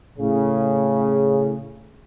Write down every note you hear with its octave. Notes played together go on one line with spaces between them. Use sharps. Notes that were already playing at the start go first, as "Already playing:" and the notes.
A2 C#3